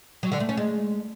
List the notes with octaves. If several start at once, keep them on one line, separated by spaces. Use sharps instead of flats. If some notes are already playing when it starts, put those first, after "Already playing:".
F#3
D3
A3
C#4
G#3